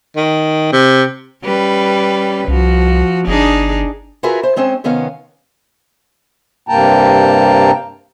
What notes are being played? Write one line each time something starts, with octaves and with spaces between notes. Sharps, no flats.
D#3
C3
G3 C#4 B4
C2 F3 F#4
G1 D4 D#4 G#4
F4 F#4 G#4 A#4 B4 E5
C5
G#3 C4 C#4 C5
C3 D#3 B3 C#4 F5
G2 C3 A#3 G5 A5 A#5